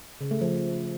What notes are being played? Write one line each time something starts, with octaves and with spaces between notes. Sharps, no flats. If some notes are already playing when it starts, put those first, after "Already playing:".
C#3
A3
F3